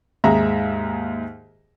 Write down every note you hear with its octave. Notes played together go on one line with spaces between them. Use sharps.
D#2 G#2 G#4 E5 A#5